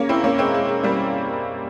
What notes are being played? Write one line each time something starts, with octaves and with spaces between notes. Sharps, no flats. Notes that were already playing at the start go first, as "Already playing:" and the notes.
Already playing: A#3 C#4
C4 E4
A#3 C#4
G#3 C4
G#3
G#3
G3 A#3